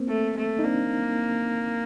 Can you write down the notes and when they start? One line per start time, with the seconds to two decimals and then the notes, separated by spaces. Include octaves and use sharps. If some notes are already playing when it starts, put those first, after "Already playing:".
Already playing: A#3 C4
0.08 A3
0.37 A3
0.59 D#4
0.65 A#3 C4 D4